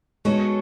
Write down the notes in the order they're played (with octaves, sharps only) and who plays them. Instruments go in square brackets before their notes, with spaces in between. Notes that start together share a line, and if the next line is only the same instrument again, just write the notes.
[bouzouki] F#3 A3 C#4 F#4 [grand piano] G#3 B3